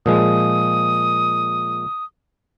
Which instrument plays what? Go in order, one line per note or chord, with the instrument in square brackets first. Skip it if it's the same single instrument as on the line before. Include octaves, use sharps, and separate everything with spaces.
[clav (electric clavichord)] A#2 F3 G#3 [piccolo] D#6